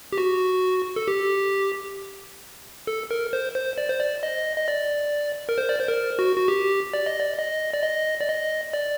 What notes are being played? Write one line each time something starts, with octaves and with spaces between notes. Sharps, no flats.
G4
F#4
A4
G4
A4
A#4
C5
C5
D5
C5
D5
D#5
D#5
D5
A#4
C5
D5
C5
A#4
F#4
F#4
G4
D5
D#5
D5
D#5
D5
D#5
D5
D#5
D5